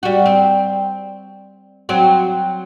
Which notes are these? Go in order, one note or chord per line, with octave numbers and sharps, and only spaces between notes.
G3 F#4
C4
F#3 C4